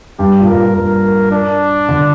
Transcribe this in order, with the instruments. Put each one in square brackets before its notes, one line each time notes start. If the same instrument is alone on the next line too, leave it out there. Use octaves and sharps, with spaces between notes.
[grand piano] G2 [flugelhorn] G4
[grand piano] A#2
[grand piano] G2 [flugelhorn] A#4
[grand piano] A#2
[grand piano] G2 [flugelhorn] A#4
[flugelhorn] D4
[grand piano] D3